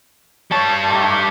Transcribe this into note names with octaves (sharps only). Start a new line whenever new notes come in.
G3 C#5 A5
A3 D#4 G4